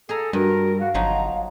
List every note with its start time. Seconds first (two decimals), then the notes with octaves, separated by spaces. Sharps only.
0.09 G#4 A4 G#5 A#5
0.33 G2 G3 F#4 A#4
0.80 F#4 F5
0.94 G1 F3 F#3 D#4 A#5